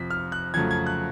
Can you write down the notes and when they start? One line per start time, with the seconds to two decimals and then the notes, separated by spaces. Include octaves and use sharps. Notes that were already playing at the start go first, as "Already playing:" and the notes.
Already playing: F2 C3 F3 B6
0.10 F6
0.32 F#6
0.54 F2 C#3 F#3 A3 G#6
0.71 G#6
0.86 F#6